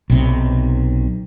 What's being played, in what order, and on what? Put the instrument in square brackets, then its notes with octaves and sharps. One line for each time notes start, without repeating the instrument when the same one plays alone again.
[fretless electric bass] B1 C3